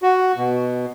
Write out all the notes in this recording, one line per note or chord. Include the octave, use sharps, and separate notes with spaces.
F#4
B2